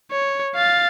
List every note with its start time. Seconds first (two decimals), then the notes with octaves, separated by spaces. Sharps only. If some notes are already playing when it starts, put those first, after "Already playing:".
0.11 C#5
0.56 F5 A6